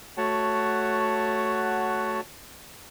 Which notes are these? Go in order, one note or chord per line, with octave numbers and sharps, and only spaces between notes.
A3 F#4 C#5 F#5 A5